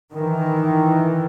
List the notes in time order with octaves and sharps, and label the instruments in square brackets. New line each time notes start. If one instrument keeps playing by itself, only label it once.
[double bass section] D#3 E3